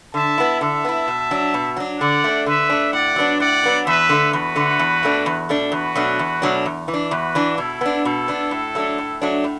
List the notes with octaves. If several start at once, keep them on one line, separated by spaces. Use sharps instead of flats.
D3 E5 A5
B3 E4
D3 E5 A5
B3 E4
B2
F#3 D4
B2
F#3 D4
D3 D5 F#5
A3 D4
D3 B4 E5
A3 D4
A2 D5 F#5
F#3 B3 D4
A2 D5 F#5
F#3 B3 D4
E2 B4 E5
D3 A3
E2 F#4 B4
D3 A3
E2
B2 A3 D4
E2
B2 A3 D4
E2 F#4 B4
B2 F#3 A3 D4
E2
B2 F#3 A3 D4
E2
E3
D4
E2 F#4 B4
E3 D4
B2 E4 A4
B3 D4
B2 E4 A4
B3 D4
A2
F#3 A3 D4
A2
F#3 A3 D4
A2